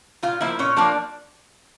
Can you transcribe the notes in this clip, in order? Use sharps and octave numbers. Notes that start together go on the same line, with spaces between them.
A#2 F4 F5
F3 A#3 E4 E5
A#2 C#4 C#5
F3 A#3 D4 D5